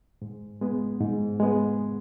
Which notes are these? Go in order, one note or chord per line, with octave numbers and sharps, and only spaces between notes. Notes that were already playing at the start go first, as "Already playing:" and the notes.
G#2
G#3 B3
G#2
G#3 B3